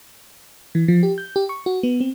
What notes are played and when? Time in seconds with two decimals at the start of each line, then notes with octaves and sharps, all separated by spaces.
0.75 E3
0.88 F3
1.03 G4
1.18 G6
1.36 G4
1.49 C#6
1.66 F#4
1.83 B3
2.01 C4